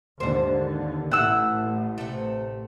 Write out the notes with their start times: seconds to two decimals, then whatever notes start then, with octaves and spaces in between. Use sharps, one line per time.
0.20 D#2 G#2 D3 C5
1.11 A1 A2 A3 E4 F#5 E6
1.98 C3 A3